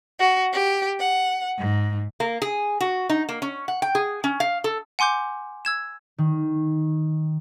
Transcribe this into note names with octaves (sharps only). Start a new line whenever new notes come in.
F#4
G4
F#5
G#2
A#3
G#4
F#4
D#4
A#3
C#4
F#5
G5
G#4
C#4
F5
A4
F#5 G#5 C6 D6 G6
E6 G#6 E7
D#3